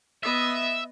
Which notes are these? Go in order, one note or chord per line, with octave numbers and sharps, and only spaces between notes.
B3 D#5 E5